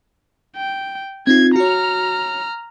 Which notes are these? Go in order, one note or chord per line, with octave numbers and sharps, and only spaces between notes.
G5
C4 D#4 F4 G#6
F#4 C#5 A#5 F6